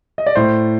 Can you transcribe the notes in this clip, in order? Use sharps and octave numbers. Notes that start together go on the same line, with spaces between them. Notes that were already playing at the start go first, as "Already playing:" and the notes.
D#5
D5
A2 C5